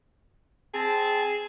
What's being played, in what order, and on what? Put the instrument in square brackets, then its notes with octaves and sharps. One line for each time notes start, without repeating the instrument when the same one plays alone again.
[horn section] C4 A5 [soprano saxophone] G#4